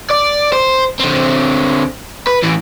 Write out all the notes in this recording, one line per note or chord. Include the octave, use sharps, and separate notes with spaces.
D5
C5
D3 C4
B4
A2 E3